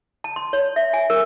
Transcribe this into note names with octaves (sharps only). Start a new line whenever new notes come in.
A5
C6
C#5
E5
G#5
A#4